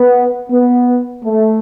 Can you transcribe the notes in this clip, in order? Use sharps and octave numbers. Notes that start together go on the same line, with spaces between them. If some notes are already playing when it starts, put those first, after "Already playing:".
Already playing: B3
B3
A3